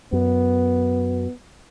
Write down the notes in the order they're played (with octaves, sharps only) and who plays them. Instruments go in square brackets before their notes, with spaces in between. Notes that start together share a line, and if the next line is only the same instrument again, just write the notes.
[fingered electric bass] F#2 [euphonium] B3